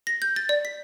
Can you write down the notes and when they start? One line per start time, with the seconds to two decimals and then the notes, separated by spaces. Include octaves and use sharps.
0.07 A#6
0.22 G6
0.36 A6
0.49 D5
0.65 B6